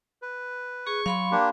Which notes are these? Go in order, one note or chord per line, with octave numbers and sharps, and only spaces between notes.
B4
G#4 C#6
F#3 F5 B5 C6
A#3 D4 G4